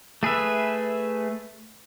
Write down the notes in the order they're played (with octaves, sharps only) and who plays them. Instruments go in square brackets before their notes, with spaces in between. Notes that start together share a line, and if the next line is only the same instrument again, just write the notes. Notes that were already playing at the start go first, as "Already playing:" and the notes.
[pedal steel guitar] A3 G#4 B4 E5